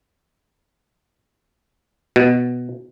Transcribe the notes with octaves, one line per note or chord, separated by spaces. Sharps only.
B2